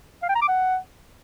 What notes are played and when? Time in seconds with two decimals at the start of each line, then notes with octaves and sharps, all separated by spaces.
0.22 F5
0.29 G5
0.35 A#5
0.42 D6
0.48 F#5